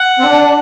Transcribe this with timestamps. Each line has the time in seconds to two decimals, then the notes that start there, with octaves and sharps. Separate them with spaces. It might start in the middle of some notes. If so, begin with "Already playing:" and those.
Already playing: F#5
0.19 C4
0.24 D4